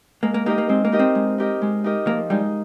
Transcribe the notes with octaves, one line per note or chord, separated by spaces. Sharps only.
G#3 A#3
A#3
A#3 D#4 G4 A#4 D#5
A#3
G#3 C4
A#3
D#4 G4 A#4 D#5
C4
G#3
D#4 G4 A#4 D#5
G#3
D#4 G4 A#4 D#5
F3 A#3
G3 G#3 D#4